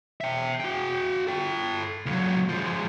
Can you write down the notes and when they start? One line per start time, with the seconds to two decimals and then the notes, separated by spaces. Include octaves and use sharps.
0.21 E5 G5
0.60 F#4 G5
1.27 A4 G5
2.06 C#2 F#3
2.49 F3 G#3